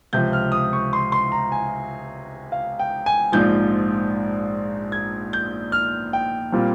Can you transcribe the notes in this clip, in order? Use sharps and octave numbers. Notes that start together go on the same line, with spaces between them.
C#2 C3 F3 G6
F6
D#6
C#6
C6
C6
A#5
G#5
F5
G5
G#5
A#1 G#2 F3 G6
G#6
G6
F6
G5
A#2 G3 C4 F4